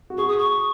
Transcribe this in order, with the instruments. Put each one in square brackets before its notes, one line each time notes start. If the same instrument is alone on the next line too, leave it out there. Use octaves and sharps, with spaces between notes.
[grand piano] F#4
[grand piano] G#4 [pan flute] C#6
[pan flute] D#6
C#6